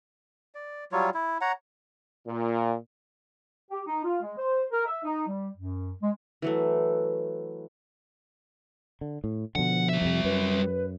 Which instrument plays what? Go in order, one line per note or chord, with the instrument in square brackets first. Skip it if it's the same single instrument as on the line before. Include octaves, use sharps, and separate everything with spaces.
[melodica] D5
F#3 G3 F4 C#5
E4
C#5 F#5 A#5
[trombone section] A#2
[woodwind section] G4
D#4
F4
G#3
C5
A#4
E5
D#4
G3
F#2
G#3
[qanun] E3 F#3 A3
[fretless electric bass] D3
A2
[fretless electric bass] B2 D3 [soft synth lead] F3 [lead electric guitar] F#5
[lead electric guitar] G3 E5
[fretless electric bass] F2 C3
[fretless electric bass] F#2 [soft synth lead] B4